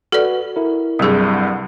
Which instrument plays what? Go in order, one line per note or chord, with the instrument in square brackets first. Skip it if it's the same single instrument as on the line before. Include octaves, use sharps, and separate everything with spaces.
[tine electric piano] F#4 B4 [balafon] A4 D5
[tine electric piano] E4 A#4
[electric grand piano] C2 G2 [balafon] F#3 G#4
[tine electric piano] F#5